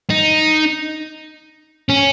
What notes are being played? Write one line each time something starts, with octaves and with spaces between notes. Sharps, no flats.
D#4
C#4